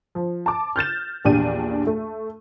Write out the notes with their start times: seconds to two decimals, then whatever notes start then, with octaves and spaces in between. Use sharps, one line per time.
0.15 F3
0.46 A5 D6
0.76 F6 G6 A6 E7
1.25 A#1 E2 A#2 D4 G4 D#7
1.87 A3